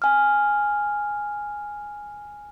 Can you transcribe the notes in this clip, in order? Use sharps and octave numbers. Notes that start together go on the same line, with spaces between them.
G#5 F6